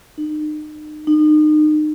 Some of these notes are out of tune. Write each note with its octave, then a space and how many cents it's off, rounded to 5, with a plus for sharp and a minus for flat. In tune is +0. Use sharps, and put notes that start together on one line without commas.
D#4 -40
D#4 -35